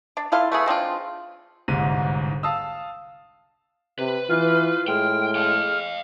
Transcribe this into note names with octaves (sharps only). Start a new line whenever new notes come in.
D4
E4 F4 A4 F5
A3 B3 G#4
G#3 C4 D4 F4
G1 C2 G#2 D#7
F5 A5 D#6 E6
C3 B4
E3 F4 F6
A2 G#3 G5 F6
F5 G5